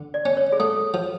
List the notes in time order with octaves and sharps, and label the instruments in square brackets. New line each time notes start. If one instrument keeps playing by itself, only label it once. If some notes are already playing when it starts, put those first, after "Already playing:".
Already playing: [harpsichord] D3
[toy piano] D5
[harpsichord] C#4
[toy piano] C#5
G#4
[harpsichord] A3 [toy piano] A4
[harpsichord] F3